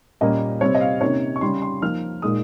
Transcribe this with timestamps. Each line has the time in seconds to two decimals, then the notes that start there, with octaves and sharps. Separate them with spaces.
0.21 A#2 G3 A#3 C#4 D#5
0.61 C3 G3 C4 C#5
0.75 D#5
0.81 F5
1.01 C3 D#3 A#3 C#4 C#5
1.36 C#6
1.41 C#3 G3 C#4 C6
1.62 C6
1.82 F3 A#3 D#4 F6
2.22 A#2 G#3 D#4 D#6